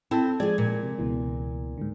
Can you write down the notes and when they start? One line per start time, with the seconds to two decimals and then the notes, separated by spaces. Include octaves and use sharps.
0.11 C4 E4 A4 A5
0.40 F3 G#3 G#4 D5 G#6
0.58 A#2
0.83 C3
0.99 C#2 B2 E3
1.78 G#2 D3